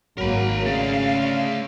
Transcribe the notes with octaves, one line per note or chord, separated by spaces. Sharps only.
G#1 F#3 A#3 A#4 B5
C#3 A3 D5 F5